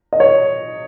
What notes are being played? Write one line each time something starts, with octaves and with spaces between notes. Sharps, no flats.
D#5
C#5